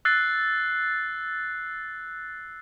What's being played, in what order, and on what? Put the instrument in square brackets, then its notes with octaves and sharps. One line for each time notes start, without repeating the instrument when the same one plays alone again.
[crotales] E6 F#6 A6 C7